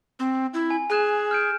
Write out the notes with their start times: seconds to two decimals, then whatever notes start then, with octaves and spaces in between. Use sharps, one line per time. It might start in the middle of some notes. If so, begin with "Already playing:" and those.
0.19 C4
0.54 E4
0.70 G#5
0.90 G#4 G#5 F#6 E7
1.31 F6 G6 D7